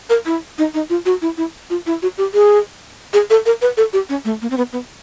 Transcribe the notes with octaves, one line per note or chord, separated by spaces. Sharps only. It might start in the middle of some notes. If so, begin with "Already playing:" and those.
A#4
E4
D#4
D#4
F4
F#4
E4
E4
F4
E4
F#4
G4
G#4
G#4
A4
A#4
B4
A4
G4
C#4
A3
A#3
C4
B3
B3